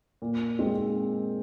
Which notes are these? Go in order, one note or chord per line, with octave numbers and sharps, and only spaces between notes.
A#2
G#3 C4 D#4